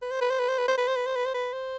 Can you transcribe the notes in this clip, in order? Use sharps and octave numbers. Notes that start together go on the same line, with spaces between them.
B4
C5
B4
C5
B4
C5
B4
C5
B4
C5
B4
C5
B4
C5
B4
C5